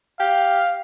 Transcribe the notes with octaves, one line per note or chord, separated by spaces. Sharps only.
G4 F5